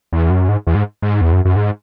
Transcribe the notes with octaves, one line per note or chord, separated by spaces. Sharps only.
E2
F#2
G#2
E2
G#2
G#2
E2
F#2
F#2
G#2